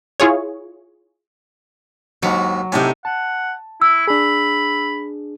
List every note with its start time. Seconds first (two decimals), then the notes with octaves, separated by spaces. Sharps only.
0.20 E4 F4 G#4 C#5
2.23 D#2 G#2 F#3 D#4
2.72 A2 C3 D#4 D5 G#5
3.05 F#5 A5
3.82 E4 E6
4.08 D4 G#4 B5